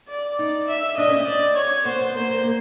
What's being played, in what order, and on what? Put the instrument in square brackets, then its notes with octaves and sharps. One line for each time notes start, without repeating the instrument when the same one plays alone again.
[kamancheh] D5
[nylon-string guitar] D#4
[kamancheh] E5
[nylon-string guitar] D4 [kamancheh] D#5
[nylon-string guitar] C#4
C4
[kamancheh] D5
C#5
[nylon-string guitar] B3 [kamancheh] C5
[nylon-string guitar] B3
[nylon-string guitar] A#3 [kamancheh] C5
[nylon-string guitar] A#3
A#3